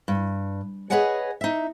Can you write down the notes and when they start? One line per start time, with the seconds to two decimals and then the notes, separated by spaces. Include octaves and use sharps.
0.08 G2
0.90 G#4 B4 C#5 D#5 F#5 G#5
1.41 D#4 E5